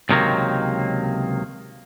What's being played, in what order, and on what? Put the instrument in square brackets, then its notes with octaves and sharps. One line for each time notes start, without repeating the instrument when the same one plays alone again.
[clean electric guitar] C#2 C3 D#3 F#3 A#3